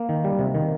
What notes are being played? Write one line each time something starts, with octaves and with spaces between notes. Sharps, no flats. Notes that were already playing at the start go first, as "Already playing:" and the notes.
Already playing: A#3
D#3
G3
C3
D#3